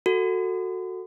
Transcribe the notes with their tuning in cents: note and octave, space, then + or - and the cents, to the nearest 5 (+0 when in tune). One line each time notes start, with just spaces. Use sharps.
F#4 +0 A4 +20